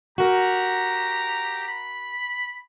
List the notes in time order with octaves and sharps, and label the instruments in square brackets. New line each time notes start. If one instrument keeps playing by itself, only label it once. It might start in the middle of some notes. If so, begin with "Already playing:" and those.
[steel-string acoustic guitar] F#4 A#4 [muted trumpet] G4 [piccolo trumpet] A#5
[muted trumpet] B5